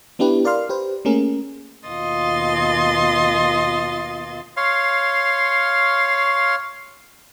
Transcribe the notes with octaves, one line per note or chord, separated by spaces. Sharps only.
B3 D4 E4 G4 B4
A#4 D5 F5 C6 F6
G4 B4 C5
A3 A#3 C#4 G#4 A#4
D#2 B2 F4 D#5 C6 A6
C#5 F5 C6